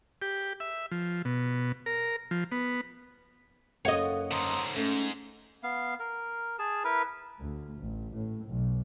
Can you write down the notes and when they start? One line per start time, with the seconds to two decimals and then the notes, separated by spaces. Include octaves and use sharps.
0.22 G4
0.60 E5
0.92 F3
1.25 B2
1.86 A#4
2.31 F3
2.52 B3
3.85 F#1 A4 C#5 D#5 F5 F#5
4.31 G#2 D3 A#5 C6 D#6
4.76 G#2 A3 C#4
5.63 B3 F5
5.99 A#4
6.59 G#4 A5
6.84 E4 A#4 B4
7.41 D2
7.79 A1
8.15 A2
8.47 B1